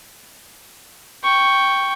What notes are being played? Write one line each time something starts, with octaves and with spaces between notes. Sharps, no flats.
G5 C#6